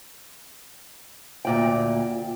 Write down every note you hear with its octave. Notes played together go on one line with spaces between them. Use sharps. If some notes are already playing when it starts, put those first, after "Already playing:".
D2 A#2 G5